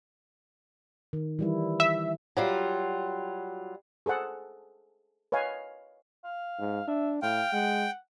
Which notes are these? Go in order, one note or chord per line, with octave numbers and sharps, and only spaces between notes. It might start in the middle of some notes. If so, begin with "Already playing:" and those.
D#3
E3 G3 E4
E5
F#3 G3 F4
G#4 A4 C5 F#5
B4 C#5 D#5 F5 G#5
F5
G#2
D4 E5
A2 F5 G5
G#3 F#5